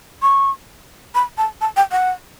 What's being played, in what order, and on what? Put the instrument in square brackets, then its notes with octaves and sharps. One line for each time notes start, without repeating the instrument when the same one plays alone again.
[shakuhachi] C#6
B5
A5
A5
G5
F#5